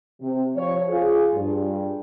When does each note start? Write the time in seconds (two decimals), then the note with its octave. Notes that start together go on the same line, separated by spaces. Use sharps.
0.21 C3
0.56 F3 C#5
0.89 F4 G#4
1.36 G2